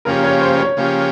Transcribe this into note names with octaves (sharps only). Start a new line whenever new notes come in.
C#3 F3 A#3 C#4 G4 A#4
C#5
C5
C#5
C#3 F3 A#3 C#4 G4